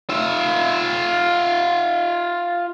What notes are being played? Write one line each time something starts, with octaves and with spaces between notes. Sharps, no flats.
F4 E5